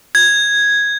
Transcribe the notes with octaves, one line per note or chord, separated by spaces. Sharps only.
G#6